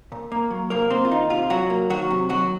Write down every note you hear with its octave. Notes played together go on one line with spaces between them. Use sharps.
A#2
A#3
F#3
C2 A#3 A#4
A#3 C4 C5
F4
D#3 D#4
C3 F4
C2 F#3 F#4
A#3
D#3 F#3 F#4
C3
D#2 F#3 F#4